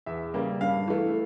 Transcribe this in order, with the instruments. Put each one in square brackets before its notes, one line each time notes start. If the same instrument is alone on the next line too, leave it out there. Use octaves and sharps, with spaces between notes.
[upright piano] E2 E5
C#3 G3 A#3
G2 F5
E3 A3